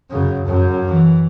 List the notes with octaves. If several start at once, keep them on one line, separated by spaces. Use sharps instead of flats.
F#2 C#3
F#2
E3